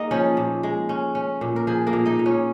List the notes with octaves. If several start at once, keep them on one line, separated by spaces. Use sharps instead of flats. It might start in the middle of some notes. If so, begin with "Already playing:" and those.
Already playing: A#3 D#4 G#4 A#4 D#5
F3 C#4 C#5
A#2
G#3
C#4
C#4
A#2
A#4
F3 G#4
A#3 A#4
A#2
D#4 D#5
A#2
C#4 C#5